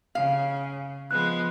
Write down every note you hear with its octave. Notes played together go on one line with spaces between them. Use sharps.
C#3 F5
F3 G#3 B3 F#6